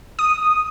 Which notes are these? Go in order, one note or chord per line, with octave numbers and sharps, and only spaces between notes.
D#6